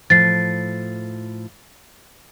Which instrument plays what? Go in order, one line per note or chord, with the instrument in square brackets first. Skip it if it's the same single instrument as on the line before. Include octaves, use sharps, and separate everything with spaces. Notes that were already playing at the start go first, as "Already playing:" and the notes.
[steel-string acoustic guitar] A2 F3 [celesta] A6 C7